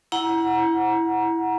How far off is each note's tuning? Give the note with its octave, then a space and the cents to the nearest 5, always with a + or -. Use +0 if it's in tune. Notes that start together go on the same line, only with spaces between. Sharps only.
E4 +0 F#5 +0 A#5 +25